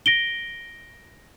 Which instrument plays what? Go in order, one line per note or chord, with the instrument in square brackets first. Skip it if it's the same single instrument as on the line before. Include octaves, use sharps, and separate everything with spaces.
[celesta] A#6 D7 G7